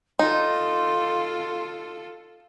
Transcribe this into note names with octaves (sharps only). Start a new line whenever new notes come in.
D#4 F4 A4 C6